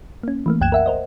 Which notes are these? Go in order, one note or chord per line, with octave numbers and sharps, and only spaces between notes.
A#3 C#4
E3 A3 A#3
C2 F#2 G5 F#6 G#6 E7
A#4 E5 F#5
A#4 C5 D#5